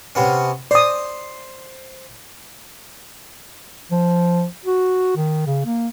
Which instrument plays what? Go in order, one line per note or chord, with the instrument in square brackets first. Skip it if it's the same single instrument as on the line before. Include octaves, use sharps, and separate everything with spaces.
[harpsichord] C3 B3 C#4
[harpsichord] C5 [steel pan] D5 D#6
[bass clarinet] F3
F#4
D#3
C#3
A#3